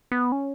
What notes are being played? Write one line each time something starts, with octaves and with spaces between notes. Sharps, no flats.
B3
C#4